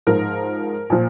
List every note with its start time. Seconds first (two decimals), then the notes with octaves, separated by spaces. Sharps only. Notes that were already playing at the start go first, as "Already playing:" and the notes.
0.07 G#2 F3 A#4
0.90 A#2 F3